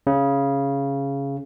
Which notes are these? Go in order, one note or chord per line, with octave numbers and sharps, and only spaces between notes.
C#3